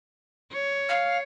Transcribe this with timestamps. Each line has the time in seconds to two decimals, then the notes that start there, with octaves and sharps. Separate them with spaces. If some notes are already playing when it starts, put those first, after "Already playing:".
0.52 C#5
0.88 F5